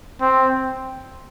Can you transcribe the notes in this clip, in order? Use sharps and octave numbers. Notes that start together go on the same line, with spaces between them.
C4